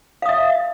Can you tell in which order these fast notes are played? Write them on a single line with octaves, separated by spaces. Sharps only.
F5 D#6 E5